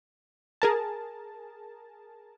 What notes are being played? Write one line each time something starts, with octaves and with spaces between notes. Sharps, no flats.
G#4 A#4 A5